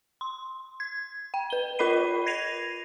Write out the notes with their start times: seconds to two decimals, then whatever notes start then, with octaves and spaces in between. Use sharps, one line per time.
0.21 C6
0.80 G#6
1.34 G5
1.50 B4 G7
1.79 F4 A#4 D#5 B5 C7 D#7
2.26 G#6 A#6 C7 D#7 F7